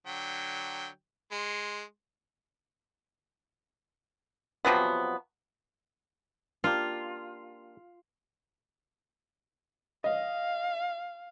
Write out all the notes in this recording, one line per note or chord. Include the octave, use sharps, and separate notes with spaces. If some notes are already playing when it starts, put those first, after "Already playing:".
D3 F#3 G5
G#3 C6
C3 F3 F#3 B3
A#3 D4 F4 G4
D#5 F5